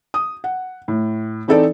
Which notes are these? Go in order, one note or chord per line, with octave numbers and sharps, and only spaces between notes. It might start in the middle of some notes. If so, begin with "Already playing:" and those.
D#6
F#5
A2
E3 C4 D#4 A4 C5 D5